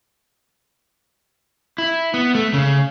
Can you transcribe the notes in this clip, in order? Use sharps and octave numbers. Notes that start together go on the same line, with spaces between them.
E4
B3
A3
C#3